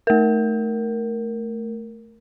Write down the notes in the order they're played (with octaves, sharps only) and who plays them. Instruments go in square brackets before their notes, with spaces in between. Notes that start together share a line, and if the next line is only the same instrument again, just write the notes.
[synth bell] A3 A#4